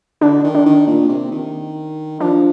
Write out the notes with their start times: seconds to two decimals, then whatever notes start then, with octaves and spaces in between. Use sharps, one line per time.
0.21 D3 D4
0.43 D#3
0.55 D4
0.65 D#3
0.87 A#2
1.09 C3
1.32 D#3
2.20 F3 D4